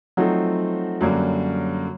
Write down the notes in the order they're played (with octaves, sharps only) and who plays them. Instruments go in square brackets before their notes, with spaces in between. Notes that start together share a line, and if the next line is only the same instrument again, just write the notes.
[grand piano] F3 A3 C4 D#4 F#4 [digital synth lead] F#3
[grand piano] F#2 D3 G3 A#3 [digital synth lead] F#3